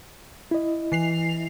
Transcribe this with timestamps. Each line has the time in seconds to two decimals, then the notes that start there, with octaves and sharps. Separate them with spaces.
0.51 E4 D#5
0.92 E3 C7 F7